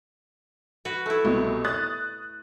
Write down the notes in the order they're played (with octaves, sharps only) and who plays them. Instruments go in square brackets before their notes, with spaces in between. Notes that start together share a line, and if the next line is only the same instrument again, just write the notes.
[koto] F#4 B4
A3 E4
[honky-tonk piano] C2 B2
D#6 F#6 A6